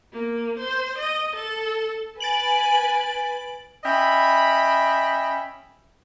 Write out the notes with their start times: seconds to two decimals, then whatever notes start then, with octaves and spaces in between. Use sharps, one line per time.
0.13 A#3
0.59 C5
0.98 D#5
1.36 A4
2.20 B4 G#5 A6 D7 F#7
3.84 C#4 D#5 E5 G5 B5